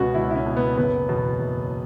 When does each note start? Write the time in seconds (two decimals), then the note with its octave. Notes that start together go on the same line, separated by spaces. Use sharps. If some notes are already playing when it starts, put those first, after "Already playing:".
Already playing: C#2 B2 B3 C#4 F#4
0.14 C#2 E4
0.30 E4
0.36 C#4
0.46 B2
0.57 B3
0.77 F#1 B3
1.08 E2 B2
1.39 F#1